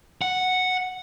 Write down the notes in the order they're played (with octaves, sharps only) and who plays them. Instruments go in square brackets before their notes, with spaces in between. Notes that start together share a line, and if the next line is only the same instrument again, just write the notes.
[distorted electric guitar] F#5